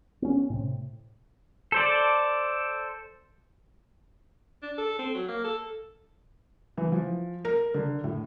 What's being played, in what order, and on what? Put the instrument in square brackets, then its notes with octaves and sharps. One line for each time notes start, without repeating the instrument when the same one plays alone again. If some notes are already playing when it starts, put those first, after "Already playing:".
[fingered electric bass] B3 C#4
A2 C3
[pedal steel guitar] A4 C5 D5
[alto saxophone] D4
A4
C4
F#3
A#3
A4
[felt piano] E3
F3
A#4
D3
A2